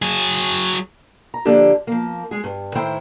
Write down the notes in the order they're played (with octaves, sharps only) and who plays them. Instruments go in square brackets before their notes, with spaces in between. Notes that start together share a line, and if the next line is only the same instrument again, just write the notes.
[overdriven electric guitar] F#3 G#4
[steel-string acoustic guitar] A#5
D3 F3 A#3 D4 G4 A4
F3 A#3
G#3 G#4
G2
A2 D#3 A3 E4 C5 G5